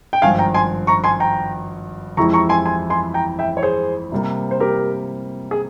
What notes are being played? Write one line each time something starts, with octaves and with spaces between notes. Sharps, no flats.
G5
G#1 G2 F3 F5 G#5
G5 A#5
G#5 C6
A#5 C#6
G#5 C6
G5 A#5
F2 E3 G#3 E4 G4 A#5 C#6
A#5 C#6
G#5 C6
G#5 C6
G#5 C6
G5 A#5
E5 G5
C#5
G#4 C5
C3 G3 A#3
C5
G4 A#4
G#4